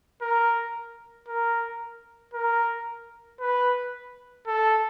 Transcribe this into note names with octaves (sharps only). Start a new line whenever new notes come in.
A#4
A#4
A#4
B4
A4